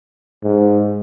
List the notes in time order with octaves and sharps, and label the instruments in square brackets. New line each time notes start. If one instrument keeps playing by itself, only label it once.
[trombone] G#2